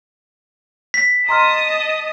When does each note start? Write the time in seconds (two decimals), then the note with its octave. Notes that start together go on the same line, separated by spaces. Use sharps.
0.94 B6
1.29 D#5 A5 A#5 C6 D#6 F6